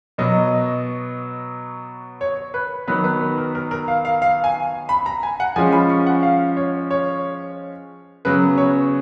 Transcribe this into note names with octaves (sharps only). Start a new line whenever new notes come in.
B2 F#3 B3 D#5
C#5
B4
D#3 F#3 B3 B4
B4
B4
A#4
A#4
A#4
F5
F5
F5
G#5
B5
A#5
G#5
F#5
F3 G#3 C#4 G#5
B5
C#6
F#5
F5
C#5
C#5
C#3 F#3 B3 B4
C#5